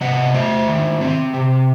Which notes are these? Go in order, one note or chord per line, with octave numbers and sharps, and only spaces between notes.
C3 D#5 F#5
A3 C5 E5
D#3
C4
C3